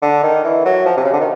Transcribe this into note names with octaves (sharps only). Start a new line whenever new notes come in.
D3
D#3
E3
F#3
F3
C3
C#3
D3
D#3